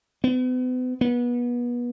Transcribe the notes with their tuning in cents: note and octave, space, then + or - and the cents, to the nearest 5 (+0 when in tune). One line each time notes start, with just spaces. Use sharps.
B3 +40
B3 -30